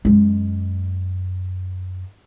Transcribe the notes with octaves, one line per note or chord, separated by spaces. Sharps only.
F#2 G#3